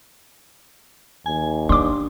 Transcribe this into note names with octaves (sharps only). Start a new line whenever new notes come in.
D#2 G#5
C#4 D4 C6 D6